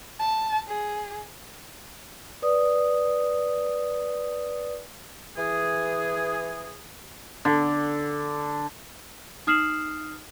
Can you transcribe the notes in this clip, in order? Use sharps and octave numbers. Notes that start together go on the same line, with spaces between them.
A5
G#4
B4 D5 D#6
E3 G#4
D3
D#4 D#6 F6 C7 E7 F#7